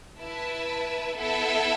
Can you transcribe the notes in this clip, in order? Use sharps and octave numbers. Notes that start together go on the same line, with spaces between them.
E4 B4 E5 A5
B3 E4 A4 E5